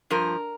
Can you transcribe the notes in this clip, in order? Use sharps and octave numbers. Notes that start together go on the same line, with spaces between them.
G2 F3 A#4